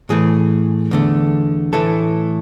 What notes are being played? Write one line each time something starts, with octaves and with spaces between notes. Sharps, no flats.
A2 E3 A3 G#4
E2 D3 A3
A2 E3 A3 A4